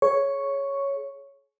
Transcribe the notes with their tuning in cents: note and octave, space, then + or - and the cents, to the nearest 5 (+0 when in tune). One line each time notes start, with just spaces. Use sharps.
G#4 +35 C#5 +0 C#6 +0